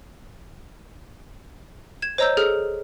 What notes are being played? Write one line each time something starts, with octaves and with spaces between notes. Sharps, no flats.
G#6 E7
C5 C#5 D#5 A#5 E6 G6
G#4 A4 F6